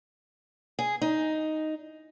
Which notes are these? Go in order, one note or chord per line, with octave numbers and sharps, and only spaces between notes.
G#4
D#4